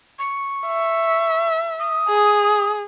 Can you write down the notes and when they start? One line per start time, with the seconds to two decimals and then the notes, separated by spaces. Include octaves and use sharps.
0.19 C#6
0.67 E5
1.79 D#6
2.08 G#4